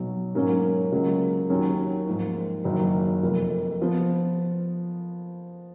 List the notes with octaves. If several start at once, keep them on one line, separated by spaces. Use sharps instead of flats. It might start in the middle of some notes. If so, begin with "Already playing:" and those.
Already playing: B1 B2 F#3
G#2 F#3 A#3 C#4
C#2 C#3 F#3 A#3
D#2 D#3 F#3 C#4
G#2 F3 A#3
F#1 F#2 D#3 F#3 A#3
F1 F2 F3 A#3
F3 B3